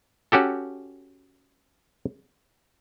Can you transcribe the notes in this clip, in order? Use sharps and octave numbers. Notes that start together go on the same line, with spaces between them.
C#4 F#4 G4 A4